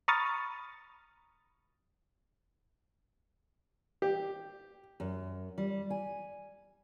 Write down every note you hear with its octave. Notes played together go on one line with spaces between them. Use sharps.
A#5 B5 C#6 D#6 F6 A6
G4
F#2
G3
G#5